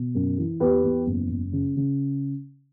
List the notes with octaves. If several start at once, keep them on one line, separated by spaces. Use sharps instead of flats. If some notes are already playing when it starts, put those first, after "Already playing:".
Already playing: B2
F#2
E3
E2 G4 B4
E2
F#1
F#1
C#3
C#3